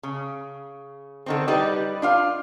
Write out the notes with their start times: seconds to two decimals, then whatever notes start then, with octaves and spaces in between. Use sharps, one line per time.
0.03 C#3
1.26 D3 D#3 C4
1.48 G3 D#4 B4 D5 D#5
2.02 D4 F4 F5